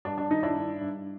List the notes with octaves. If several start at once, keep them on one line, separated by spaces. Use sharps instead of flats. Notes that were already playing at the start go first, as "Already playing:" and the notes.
G2 D4
D4
D#3 D#4
D4 E4
G2
G2